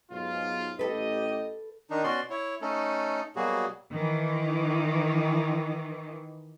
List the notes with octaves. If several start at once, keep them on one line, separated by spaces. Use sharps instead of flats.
B1 G#2 F4
A1 G4 A4 B4 D#5
D#3 D4 D#4
B2 C#4 F#4 D5 C6
E4 C#5
A3 C#4 D#4 A4
B2 F#3 G3 A#3 F#4 G#4
D#3 E3